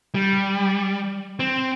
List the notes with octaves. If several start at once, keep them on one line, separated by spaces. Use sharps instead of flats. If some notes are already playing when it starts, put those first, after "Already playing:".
G3
C4